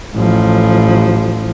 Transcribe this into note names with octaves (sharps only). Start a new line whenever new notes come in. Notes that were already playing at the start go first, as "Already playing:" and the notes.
A1 F3